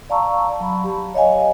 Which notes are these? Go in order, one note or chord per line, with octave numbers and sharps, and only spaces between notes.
D5 F5 A5 A#5 C#6 E6
F#3 A5 B5
G4
C#5 D#5 F5 G#5